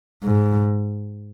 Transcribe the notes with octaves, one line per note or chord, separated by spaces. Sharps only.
G#2